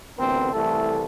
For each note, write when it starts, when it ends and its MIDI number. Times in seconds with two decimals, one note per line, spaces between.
0.17 0.49 33
0.17 0.49 38
0.17 0.49 59
0.17 0.49 60
0.17 0.49 70
0.53 1.05 36
0.53 1.05 52
0.53 1.05 57
0.53 1.05 69